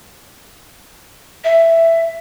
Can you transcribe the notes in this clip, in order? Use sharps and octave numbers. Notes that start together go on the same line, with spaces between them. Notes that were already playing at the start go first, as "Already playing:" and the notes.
E5